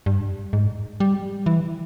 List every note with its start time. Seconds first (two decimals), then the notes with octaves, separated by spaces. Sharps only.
0.06 G2
0.53 G#2
1.00 G3
1.46 E3